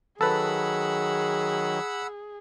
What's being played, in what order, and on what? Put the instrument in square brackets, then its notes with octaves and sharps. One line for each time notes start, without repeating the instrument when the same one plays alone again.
[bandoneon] D#3 F#3 [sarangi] G#4 [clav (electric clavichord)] A4 B4 [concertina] F#5 B5 E6